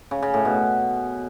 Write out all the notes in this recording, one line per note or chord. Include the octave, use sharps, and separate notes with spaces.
C#3
C#3
A2
B2